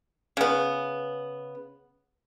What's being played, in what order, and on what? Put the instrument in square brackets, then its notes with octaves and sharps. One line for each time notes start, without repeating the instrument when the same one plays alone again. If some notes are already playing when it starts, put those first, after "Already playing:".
[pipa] C#3 B3